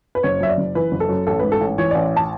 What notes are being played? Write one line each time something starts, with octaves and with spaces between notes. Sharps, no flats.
B4
F#1 C#5
F#2 E5
D5
F#1
E3 B4
F#1
A4
F#2
A1 A4
G#2 B4
A4
A1
E3 C#5
A1 D5
A5